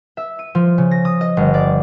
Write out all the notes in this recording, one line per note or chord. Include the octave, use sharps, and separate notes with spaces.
E5
D#7
F3
C#3
A#6
D#6
D#5
G1
D5